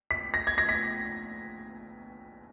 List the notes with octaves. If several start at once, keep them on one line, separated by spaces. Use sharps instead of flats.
B6
A#6
G#6
A#6
B6